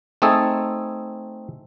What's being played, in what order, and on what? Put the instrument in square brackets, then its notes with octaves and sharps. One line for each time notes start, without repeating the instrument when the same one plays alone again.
[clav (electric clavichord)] A3 C4 D#4 G#4 A4